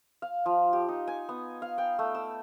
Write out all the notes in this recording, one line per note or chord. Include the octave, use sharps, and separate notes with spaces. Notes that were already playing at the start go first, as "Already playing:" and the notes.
F5
F3
G4
D#4
G#5
B3
F5
G5
A3
E6